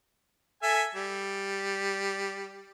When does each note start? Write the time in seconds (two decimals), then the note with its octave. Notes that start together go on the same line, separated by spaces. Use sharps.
0.63 A4 E5 G#5
0.95 G3